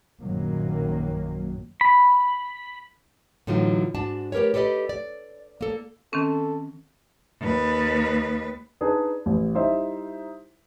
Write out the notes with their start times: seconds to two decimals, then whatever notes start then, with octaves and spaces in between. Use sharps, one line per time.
0.20 A#1 F#2 A#2 D#3 F#3 A#3
1.81 B5
3.47 A2 D3 E3 F#3 D#4 F4
3.95 G#2 D4 F#4 A5
4.32 A3 G4 A#4 B4 C#5
4.54 G4 A4 B4 D5 D#5
4.89 D5
5.61 A#3 A4
6.13 D#3 C4 C#4 A4
7.40 D#2 B4
8.81 D4 D#4 G#4 B4
9.26 A1
9.54 G3 D#4 E4 C5 D#5 E5